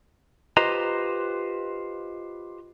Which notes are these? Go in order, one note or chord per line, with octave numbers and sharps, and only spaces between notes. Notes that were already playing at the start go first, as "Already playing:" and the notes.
F4 G4 B4 C5 D#5 A#5